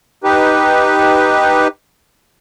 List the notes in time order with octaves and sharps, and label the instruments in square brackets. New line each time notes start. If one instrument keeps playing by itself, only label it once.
[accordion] D#4 G4 B4